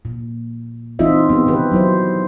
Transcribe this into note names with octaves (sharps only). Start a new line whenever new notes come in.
A#2
E3 C4 D#4 F4 D#5 E5
B3 G4
C3 D#3 G4 B4
F#3 E4 C5